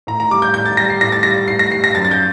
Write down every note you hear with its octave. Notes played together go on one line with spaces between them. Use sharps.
A2 A#5
A#5
G3 D6
G6
A2 G6
A6
G3 A#6
C7
A2 A#6
A6
G3 A#6
A2 C7
A#6
G3 C7
A#6
F#2 A6
A6
G6